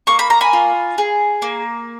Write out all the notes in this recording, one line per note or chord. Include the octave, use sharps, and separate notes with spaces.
A#3 C#6
B5
A#5
G#5 B5
F4
G#4
A#3